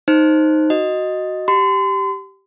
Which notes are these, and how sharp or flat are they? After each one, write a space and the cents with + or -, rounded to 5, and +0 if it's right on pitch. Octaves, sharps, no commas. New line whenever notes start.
D#4 +0 C5 +10
F#4 +0 D#5 +0
G4 -15 C6 -40